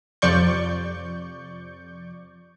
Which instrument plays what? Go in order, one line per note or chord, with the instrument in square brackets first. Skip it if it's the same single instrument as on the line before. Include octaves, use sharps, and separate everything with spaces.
[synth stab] F2 C3 F3 D5 C#6 G6